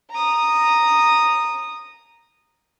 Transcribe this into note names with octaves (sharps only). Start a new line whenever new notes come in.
A#5 D#6